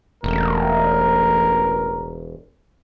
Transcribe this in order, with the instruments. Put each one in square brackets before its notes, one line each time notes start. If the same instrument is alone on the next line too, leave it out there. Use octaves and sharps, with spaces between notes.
[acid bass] E1 [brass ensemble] A1 A#4